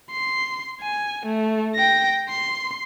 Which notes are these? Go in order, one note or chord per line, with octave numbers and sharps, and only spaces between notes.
C6
G#5
A3
G5 A#6
C6